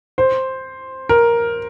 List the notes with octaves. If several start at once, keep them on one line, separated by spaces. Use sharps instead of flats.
C5
A#4